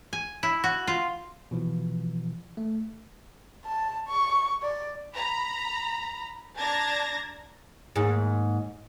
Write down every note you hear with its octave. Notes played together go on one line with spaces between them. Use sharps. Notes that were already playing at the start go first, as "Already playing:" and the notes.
G#5
E4
F#4
F4
B2 E3 F3
A3
A5
C#6
D5
A#5 B5
D4 A5 A#5 G#6 A#6
D#2 G#2